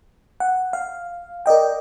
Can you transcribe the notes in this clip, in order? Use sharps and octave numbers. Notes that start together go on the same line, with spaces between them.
F#5
F5
A#4 D5 D#5 G5